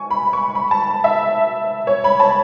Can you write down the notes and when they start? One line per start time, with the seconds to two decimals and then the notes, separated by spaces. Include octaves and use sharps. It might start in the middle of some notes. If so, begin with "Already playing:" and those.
Already playing: G#5 C#6
0.11 B5
0.33 C#6
0.55 B5
0.71 A5
1.04 E5
1.87 C#5
2.04 B5
2.20 A5